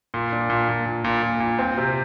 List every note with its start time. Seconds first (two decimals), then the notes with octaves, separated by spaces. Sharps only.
0.14 A#2
0.32 D4
0.50 A#2
0.69 A#2
0.86 A#2
1.04 A#2
1.23 A#2
1.40 A#2
1.59 C4
1.78 C3